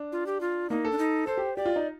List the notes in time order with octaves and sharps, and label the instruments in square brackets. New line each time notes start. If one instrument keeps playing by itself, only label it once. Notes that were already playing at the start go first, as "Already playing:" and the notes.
Already playing: [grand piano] D4
[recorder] F4
G4
F4
[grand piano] A#3 [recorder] D#4
[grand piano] A4
[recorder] D4
D#4
[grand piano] A4 [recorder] C5
[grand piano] G4
[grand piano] G4 [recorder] D5
[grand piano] F4
D#4